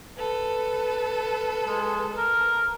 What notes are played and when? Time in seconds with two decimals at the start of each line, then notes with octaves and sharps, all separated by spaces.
0.17 A4 B4
1.67 G#3
2.18 A#4